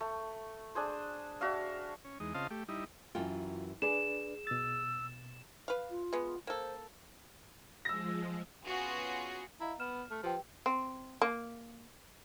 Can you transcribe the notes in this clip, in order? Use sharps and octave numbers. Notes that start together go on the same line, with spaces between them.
A3
D4 G#4 C5
D4 F#4 E5 F5
C#4
E2 G#3 D#4
C#3 C4 F4 D#5 F5 A5
A3 G4
G3 D#4 E4
F#2 E3 F4 G5
D4 G#4 B4 D5 E7
B2 E6 A6
B4 F5
F4
G#3 B3
A#3 A4 C5
F3 G#3 E6 A#6
B3 C#4 F4 F#4 G#4
E4 D#5 F5 A#5
B3 F6 E7
A3 F6
F3 G4 B4 G5
C4
A#3